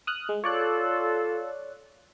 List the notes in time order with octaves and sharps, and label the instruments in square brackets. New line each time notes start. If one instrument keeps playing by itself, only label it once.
[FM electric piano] D#6 F6 F#6
G#3
[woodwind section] F4 A4 [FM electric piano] C#5 D5 F#6